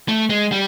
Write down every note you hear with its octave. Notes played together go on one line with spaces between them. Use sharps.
A3
G#3
G3